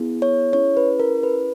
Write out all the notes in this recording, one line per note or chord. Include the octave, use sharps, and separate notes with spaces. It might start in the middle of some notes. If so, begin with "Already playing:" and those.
Already playing: B3 E4 G#4
C#5
C#4 E4 G#4 C#5
B4
A#4
B4